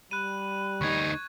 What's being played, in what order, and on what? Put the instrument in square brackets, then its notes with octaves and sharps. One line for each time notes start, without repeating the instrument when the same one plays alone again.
[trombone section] G3 [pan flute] B5 [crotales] F#6 D#7
[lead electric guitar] D2 D#4 [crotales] C#6 G#6